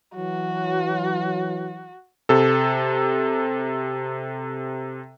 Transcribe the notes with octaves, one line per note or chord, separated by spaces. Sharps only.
E3 F#3 F#4
C3 A4